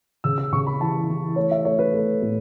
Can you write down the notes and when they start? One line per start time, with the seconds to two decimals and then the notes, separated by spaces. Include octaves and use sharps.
0.24 C#3 E6
0.38 E6
0.53 C#3 C#6
0.67 B5
0.80 E3 A5
1.09 E3
1.36 A3 C#5
1.51 E5
1.65 A3 C#5
1.79 B4
1.93 A3
2.22 A2